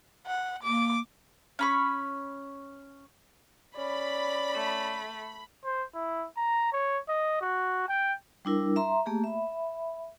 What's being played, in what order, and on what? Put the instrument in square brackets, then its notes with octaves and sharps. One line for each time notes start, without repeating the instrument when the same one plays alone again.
[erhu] F#5
[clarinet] A#3 [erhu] D6
[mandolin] C#4 B5 C#6
[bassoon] C#4 [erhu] D5 [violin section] B5
[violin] A3
[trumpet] C5
E4
A#5
C#5
D#5
F#4
G5
[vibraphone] G3 D4 E4 A#4
E5 A#5 C6
A3 A#3 G4 G#4
E5 B5